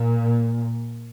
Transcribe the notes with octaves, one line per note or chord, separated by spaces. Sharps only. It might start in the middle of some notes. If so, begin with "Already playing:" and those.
Already playing: A#2